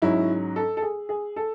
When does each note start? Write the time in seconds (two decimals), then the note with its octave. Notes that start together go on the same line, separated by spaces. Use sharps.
0.02 G#2 F#3 C#4 E4
0.56 A4
0.77 A4
0.82 G#4
1.09 G#4
1.36 A4